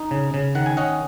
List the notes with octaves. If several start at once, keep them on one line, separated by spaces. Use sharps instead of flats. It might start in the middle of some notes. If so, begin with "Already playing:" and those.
Already playing: D#4
C#3
C#3
D#3 F#5
G#5
C#4 D#5 F#5